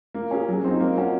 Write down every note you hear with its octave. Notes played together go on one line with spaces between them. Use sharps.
A#3
C#4 G#4
F#3
C4 D#4
A#3
C#4 F#4